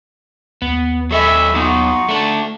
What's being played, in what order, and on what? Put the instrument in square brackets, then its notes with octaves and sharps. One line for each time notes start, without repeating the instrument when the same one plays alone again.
[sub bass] D#2 [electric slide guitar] B3
[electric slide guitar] F#3 A4 D#5 [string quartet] E5 G#5 B5
[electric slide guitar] F#3 B3 [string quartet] D#4 F4 F#4
[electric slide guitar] A3 D4